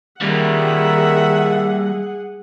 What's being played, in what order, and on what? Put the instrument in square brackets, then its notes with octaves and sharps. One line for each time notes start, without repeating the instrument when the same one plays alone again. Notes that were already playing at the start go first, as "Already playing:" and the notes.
[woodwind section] D#3 [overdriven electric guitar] G3 A#3 [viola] G#4 F#5 [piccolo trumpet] E5